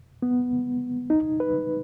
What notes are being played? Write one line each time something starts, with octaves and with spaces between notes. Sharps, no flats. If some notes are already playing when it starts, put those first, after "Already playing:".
B3
D#4
B4